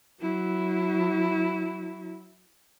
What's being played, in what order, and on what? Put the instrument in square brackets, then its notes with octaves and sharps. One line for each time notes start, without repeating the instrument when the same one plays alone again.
[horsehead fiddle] F#3 E4